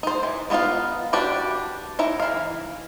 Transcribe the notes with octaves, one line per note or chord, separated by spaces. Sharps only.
D#4 C5
E3
E3 B3 D#4 F4 F5
D4 F#4 G4 B4
D#4 E4 A#5
E3 F5